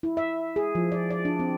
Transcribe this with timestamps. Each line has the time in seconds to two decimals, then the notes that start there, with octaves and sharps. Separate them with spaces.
0.03 E4
0.17 E5
0.56 G#4
0.75 F3
0.92 D5
1.10 D5
1.25 D4
1.39 C4